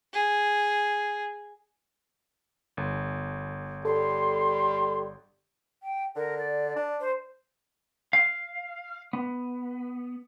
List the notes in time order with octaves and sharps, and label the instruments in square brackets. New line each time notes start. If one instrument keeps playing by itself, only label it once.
[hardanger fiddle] G#4
[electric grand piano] G1
[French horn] G3 [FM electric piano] A4 [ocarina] C6
[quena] G5
[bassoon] D3 [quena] A#4
[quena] D5
[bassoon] D4
[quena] C5
[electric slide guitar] F5
B3